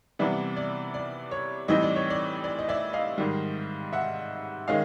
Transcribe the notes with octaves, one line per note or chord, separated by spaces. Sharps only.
C3 E3 G3 B3 D5 E5
D5
D5
C#5
A2 E3 G3 C4 D#4 D#5
D5
C#5
D5
D5
D#5
D5 E5
D#5 F5
G#2 D#3 G3
E5 F#5
D#3 G#3 C#4 D#5 F5